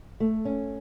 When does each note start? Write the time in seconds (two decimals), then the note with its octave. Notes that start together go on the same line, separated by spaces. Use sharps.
0.20 A3
0.45 C#4